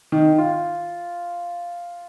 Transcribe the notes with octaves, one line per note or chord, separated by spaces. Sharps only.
D#3
F4